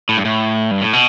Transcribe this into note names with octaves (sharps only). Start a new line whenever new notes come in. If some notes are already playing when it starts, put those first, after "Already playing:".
A2
G2
A2
G2
A2
B2